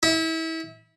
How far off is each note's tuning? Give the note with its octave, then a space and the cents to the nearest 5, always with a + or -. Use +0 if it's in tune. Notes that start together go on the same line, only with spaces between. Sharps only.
E4 -30